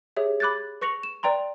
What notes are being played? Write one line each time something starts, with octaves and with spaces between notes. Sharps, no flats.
G4 G#4 C#5 E5
B5 D6 F#6 G#6 A6
B4 C#6 A#6 C#7 F7 F#7
E7
B4 D5 G5 A#5 C6